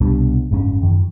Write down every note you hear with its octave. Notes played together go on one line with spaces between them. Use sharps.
C2 B2 G3 D4
F#1 G#2 G#3 C#4
F#2 D#3